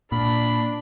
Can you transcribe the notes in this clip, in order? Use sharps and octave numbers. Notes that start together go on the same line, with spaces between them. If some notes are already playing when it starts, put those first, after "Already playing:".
A#2 D4 B5